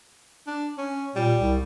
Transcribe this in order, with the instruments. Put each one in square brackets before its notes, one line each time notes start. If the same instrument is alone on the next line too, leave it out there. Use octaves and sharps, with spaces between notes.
[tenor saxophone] D4
C#4
[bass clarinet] A#2 [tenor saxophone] G3
[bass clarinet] C2